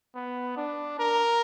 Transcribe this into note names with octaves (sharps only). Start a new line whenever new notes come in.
B3
D4
A#4